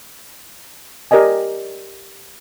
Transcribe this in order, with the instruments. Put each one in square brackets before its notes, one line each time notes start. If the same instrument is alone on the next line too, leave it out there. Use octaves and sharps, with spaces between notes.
[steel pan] G4 A#4 D5 D#5 G#5